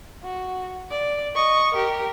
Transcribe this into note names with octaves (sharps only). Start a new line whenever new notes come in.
F#4
D5
D#5 C#6
G4 A#4